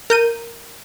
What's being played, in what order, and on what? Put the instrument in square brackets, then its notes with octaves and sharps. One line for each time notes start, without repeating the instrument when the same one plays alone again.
[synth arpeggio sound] A#4 G6 D#7